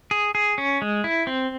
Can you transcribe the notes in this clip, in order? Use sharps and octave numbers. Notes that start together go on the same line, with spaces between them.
G#4
G#4
C#4
G#3
E4
C4